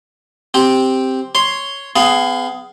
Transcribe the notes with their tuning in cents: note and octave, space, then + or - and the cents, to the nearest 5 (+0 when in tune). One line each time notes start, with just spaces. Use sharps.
C4 +0 G4 +0
C#5 +0 C6 +0
B3 +35 G#4 +0 F5 +0